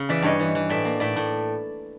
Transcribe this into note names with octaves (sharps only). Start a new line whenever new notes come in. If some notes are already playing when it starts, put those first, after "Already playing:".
Already playing: C#3
E3 D5 E5
G2 C#5 D#5
E3
E3
A2 D5 E5
A#3
A2 D5 E5
A2